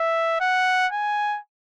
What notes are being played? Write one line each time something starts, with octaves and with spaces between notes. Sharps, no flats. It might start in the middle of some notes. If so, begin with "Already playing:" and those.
Already playing: E5
F#5
G#5